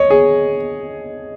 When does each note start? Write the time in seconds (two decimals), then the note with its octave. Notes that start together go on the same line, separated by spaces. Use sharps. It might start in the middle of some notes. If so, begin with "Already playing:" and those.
Already playing: C#5 D#5
0.10 G#4